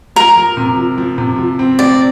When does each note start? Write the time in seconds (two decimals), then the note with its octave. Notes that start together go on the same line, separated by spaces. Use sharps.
0.16 F3 A#4
0.36 F3
0.57 C3
0.77 F3
0.98 F3
1.18 C3
1.38 F3
1.59 C4
1.79 C4 D5